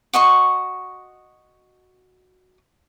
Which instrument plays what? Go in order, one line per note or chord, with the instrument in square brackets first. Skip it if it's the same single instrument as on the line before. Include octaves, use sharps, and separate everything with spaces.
[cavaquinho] F#4 D#5 C6 C#6